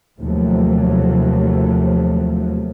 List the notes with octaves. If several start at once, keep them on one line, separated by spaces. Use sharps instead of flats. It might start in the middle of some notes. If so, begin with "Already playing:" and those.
D#2 C3 F3 F#3 A3